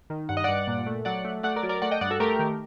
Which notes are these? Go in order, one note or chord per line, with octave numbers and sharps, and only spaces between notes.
D#3
G2 F#5
D#5
G2 D5 F#5
A#2
A3
F#3 D5 F#5
A3
A3 D5 F#5
A#4 D5
F#3
A#4 D5
A3 D5 F#5
D#5 G5
G2 D5 F#5
F#4 A4
A3 G4 A#4
D#3